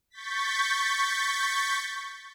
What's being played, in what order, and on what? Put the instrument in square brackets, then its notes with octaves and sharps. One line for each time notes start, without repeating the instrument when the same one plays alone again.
[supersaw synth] C#6 G6 A6 B6